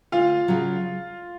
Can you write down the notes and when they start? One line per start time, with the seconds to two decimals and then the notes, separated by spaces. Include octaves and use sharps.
0.12 D2 F4 F5
0.48 C#3 F#3